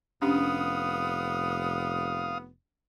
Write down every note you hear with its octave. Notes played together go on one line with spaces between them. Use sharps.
F1 B3 C#4 D4 G4 F5 D#6